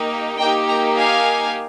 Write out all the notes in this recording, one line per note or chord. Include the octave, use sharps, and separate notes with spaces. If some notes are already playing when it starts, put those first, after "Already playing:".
Already playing: A#3 D#4 G4
A#3 D#4 G4 D#5 G5
G5 A#5
F5 G#5